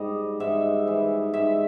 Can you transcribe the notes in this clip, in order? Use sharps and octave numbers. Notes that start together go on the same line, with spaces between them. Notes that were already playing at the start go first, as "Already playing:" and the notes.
Already playing: G#2 G3 D#5
G#2 E5
E3
G#2 E5